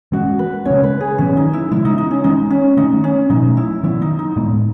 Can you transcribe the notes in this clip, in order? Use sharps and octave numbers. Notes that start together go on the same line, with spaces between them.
E3 G#3 C#4 F#4
B4
C#3 G#3 C#4 C#5
B4
G#4
D#3 F#3 B3 C#4
D#4
E4
C#3 E3 G#3 E4
D#4
D#4
C#4
E3 G#3 C#4 D#4
C#4
D#3 A3 C#4 D#4
C#4
B2 F#3 A3 C#4 D#4
E4
D#3 F#3 B3 E4
D#4
D#4
A2 G#3 B3